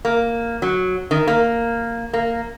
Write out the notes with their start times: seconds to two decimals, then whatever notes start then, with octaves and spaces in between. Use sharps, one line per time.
0.05 A#3
0.62 F#3
1.11 D#3
1.27 A#3
2.13 A#3